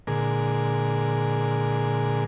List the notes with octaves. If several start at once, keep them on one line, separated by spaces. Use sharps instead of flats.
A#2 D3 G#3 G#4 A#4